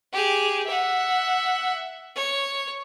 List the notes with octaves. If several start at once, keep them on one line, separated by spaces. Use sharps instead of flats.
G4 G#4
E5 F#5
C#5